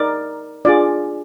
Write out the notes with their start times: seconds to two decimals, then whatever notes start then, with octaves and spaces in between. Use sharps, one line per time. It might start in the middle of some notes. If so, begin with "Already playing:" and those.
Already playing: D#4 A#4 D5
0.65 D4 F4 G#4 D5